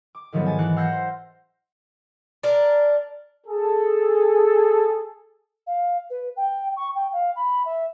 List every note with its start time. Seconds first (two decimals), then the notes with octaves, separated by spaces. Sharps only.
0.15 D6
0.32 G#2 D#3 F3 F#3 A3 B3
0.46 G#2 G#5 A5
0.59 E3 F#6 C#7
0.76 F5 F#5 E6 G6 A#6 C#7
0.93 C5
2.43 D4 A#4
3.47 G#4 A4
5.66 F5
6.10 B4
6.36 G5
6.76 C#6
6.95 G5
7.12 F5
7.35 B5
7.65 E5